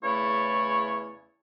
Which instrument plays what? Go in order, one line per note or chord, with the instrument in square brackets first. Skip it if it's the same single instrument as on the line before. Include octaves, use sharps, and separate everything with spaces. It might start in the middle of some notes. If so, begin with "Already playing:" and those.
[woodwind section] E2 C#3 A3 E4 C#5